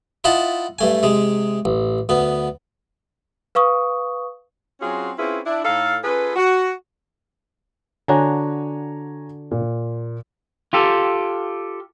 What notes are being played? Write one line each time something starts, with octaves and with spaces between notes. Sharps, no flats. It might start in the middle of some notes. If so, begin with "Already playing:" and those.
E4 F4 D#5 F#5 A5
G2 A3 G#5
C3 G#3
A1
D2 B3
B4 F5 C#6 D#6
F#3 C4 C#4 F4 F#4 G#4
C4 C#4 E4 F4 G#4 B4
D4 E4
A2 D#4 A4 F5
C#4 F4 G#4 A4 B4
F#4
D3 D4 F#4 C#5 G#5 A#5
A#2
F4 G4 A4